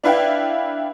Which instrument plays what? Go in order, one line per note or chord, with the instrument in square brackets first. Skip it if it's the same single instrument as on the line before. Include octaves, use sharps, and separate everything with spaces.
[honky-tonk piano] D4 E4 B4 F5 G5